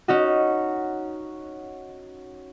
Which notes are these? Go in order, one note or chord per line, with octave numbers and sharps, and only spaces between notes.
C#4 D#4 F#4